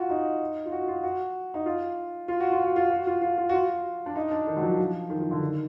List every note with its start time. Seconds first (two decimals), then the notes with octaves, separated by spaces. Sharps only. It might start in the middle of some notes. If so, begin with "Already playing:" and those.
Already playing: F4 F#4
0.10 D#4
0.66 F4
0.72 F#4
0.88 F4
1.03 F#4
1.54 D#4
1.66 F4
2.28 F4
2.40 F#4
2.52 F4
2.64 F#4
2.76 F4
2.91 F#4
3.07 F4
3.22 F4
3.38 F4
3.49 F#4
3.53 F4
4.06 D4
4.16 D#4
4.31 D4
4.47 D#3
4.57 F#3
4.63 F3
4.79 F3
5.10 D#3
5.20 F3
5.31 D3
5.41 D#3